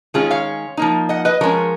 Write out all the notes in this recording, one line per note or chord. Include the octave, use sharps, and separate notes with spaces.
D#3 G#3 C#4 F4 G#4
C#5 F5
F3 A#3 D#4
D#5 F#5
B4 D#5
F3 G#3 C#4 A#4 C#5